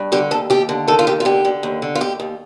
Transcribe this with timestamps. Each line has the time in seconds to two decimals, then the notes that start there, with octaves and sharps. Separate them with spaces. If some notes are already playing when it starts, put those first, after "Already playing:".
Already playing: G2
0.12 D3 G4
0.31 D#2 A4
0.50 D#2 G4
0.69 D3
0.88 D#3 A4
0.99 F4
1.07 D#2 G4
1.20 F4
1.25 D3 G4
1.45 D3
1.63 D#2
1.82 D3
1.95 F4
2.01 D#2 G4
2.20 D#2